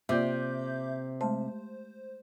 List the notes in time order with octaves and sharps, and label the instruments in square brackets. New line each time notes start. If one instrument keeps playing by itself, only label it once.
[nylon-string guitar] C3 [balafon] A#3 F4 D5 [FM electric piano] E5 D6 G6
[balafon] G#3 A3 A5 [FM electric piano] C5